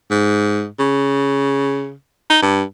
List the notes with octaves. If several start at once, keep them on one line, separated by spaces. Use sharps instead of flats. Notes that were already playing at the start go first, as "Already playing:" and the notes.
G#2
C#3
D#4
G2